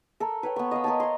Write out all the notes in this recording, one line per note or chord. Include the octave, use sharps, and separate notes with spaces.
A4 A#4
B4 C#5 G5
B3 C#6
D#5 F5 B5
A#4 D#5 G#5 A5
C#5 C6